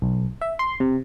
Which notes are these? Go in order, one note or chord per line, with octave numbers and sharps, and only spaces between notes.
B1
E5
C6
C3